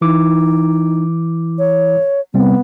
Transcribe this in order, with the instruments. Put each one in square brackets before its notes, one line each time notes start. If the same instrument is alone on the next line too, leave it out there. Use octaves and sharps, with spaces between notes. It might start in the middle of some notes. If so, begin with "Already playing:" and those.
[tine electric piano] E3 E4 D6 [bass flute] D#4
[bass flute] C#5
[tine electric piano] C3 G3 C4 [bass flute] B3